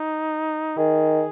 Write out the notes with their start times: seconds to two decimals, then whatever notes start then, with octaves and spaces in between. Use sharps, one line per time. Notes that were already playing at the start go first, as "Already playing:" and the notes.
Already playing: D#4
0.77 D#3 G#4